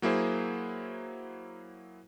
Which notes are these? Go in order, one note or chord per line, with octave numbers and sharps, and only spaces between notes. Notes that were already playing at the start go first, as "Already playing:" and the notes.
F#3 A#3 E4 G#4 C5